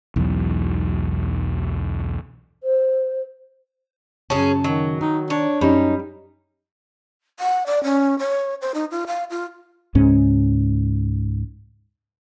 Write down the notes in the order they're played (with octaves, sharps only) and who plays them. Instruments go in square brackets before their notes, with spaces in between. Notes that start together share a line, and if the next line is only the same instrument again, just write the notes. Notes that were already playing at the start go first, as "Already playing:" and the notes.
[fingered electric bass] B1 E2 G#2 F#3
[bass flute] C5
[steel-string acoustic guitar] F#2 C#3 A5 [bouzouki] C#4 G#4
[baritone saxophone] D#3 [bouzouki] F#3
[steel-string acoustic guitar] D#3 [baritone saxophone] D#4
[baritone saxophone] D4 [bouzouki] C#5
[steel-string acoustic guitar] F#2 C#4 D#4 [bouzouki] G3
[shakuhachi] F#5
D5
C#4
C#5
C5
D#4
F4
F5
F4
[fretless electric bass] C#2 G#2 C#4